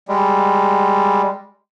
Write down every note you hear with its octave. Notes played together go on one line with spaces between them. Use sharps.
G3 G#3